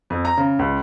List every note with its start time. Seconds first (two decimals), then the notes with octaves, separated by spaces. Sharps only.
0.10 F2
0.25 A#5
0.37 C#3
0.59 C#2